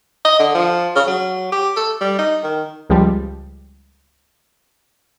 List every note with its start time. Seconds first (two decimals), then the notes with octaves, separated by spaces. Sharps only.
0.24 D#5
0.39 D3
0.54 F3
0.95 C#3
1.07 F#3
1.52 G4
1.76 A4
2.01 G3
2.18 D#4
2.43 D#3
2.90 C#2 F3 G3